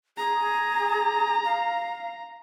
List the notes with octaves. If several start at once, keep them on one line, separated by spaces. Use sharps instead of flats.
G#4 A#5
F5